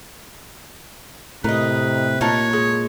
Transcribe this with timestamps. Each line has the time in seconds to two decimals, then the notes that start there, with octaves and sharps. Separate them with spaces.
1.44 A2 C3 A#4 B4 D#5
2.21 A#2 D#4 A#4 C#5 A5
2.53 G#3